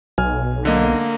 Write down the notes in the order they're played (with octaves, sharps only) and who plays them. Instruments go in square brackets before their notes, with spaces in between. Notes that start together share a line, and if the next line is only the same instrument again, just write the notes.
[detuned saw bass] B1 [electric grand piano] G#5 F6
[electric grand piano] D3 D#5 [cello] A#3